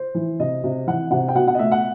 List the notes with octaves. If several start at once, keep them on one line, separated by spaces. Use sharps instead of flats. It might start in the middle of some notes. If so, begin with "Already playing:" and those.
Already playing: C5
E3
C3 D#5
C3
E3 F#5
C3 F#5
G5
B2 F#5
F#5
D#5
A3 E5
F#5